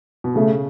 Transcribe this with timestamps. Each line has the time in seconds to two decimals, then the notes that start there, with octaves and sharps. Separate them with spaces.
0.24 B2
0.35 C#3 A3